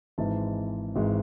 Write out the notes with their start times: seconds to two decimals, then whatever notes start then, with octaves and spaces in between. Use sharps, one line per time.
0.18 G#1 G#2 E3 G#3 A5
0.95 G#1 G#2 E3 G#3